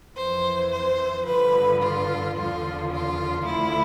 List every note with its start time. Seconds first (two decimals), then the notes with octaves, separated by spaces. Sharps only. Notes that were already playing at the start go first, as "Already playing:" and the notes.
0.18 F2 E3 C5
0.73 C5
1.27 G2 D3 F3 B4
1.82 F4
2.37 E2 D3 F3 F4
2.91 F4
3.46 D2 D3 F3 E4